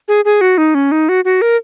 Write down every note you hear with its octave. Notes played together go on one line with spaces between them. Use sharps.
G#4
G#4
F#4
D#4
C#4
D#4
F#4
F#4
A#4